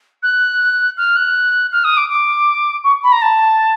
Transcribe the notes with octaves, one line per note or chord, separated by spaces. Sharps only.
F#6
F6
F#6
F6
D#6
D6
D6
C#6
B5
A#5
A5